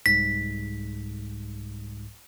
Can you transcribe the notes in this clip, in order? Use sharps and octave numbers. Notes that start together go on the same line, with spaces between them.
C2 G#2 G3 B6